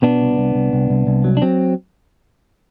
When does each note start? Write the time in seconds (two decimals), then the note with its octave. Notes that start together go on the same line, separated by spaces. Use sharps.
0.02 B2 B3 D4
0.20 C2
0.38 C2
0.55 C2
0.73 C2
0.90 C2
1.07 C2
1.24 F#3
1.37 D4
1.42 F#3 C4